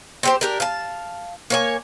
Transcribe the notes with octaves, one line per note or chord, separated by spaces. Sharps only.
C4 G4 C5
D4 G4 A#4
F5 A5
A#3 C#5 G#5